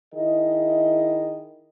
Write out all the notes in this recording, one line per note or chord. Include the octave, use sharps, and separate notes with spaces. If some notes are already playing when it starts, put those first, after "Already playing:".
D#3 E4 G#4 D#5